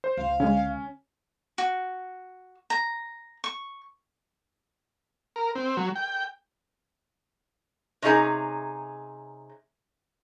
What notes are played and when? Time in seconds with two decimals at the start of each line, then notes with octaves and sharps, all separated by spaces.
0.04 C5
0.17 C#2 F5
0.40 D3 G#3 C#4
1.58 F#4
2.70 A#5
3.44 C#6
5.36 A#4
5.55 C4
5.77 F#3
5.96 G5
8.02 C3 C#4 D#4 G#4 A#5